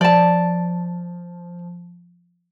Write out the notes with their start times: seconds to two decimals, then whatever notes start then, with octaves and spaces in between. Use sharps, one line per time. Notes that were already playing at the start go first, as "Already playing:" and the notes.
0.01 F3 D5 A5